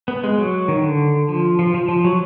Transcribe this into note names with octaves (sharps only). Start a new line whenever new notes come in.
B3
G#3
F#3
D#3
D3
F3
F3
F3
F3
F#3